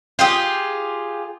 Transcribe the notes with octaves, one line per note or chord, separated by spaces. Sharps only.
F4 G4 G#4